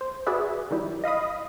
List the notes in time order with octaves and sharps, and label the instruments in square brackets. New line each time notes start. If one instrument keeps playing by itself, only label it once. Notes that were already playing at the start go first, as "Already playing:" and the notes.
[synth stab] C5
F#4 G#4 B4 D5 E5
D#3 F#3 G3 E4
D#5 F5 B5 D#6